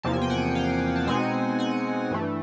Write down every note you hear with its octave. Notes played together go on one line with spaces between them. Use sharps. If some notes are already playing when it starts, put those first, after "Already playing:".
E2 C3 F3 A#3 A5
G#5
G5
F#5 G#5
F5 G5
A5
B2 G#3 C4 D#4 F#5 G#5
F#5 G#5
G2 E3 A3